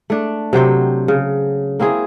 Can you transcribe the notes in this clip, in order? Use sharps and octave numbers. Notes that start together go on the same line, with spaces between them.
A3 D4
C3 F#3 C5 G5
C#3
A#3 C4 E4 G#4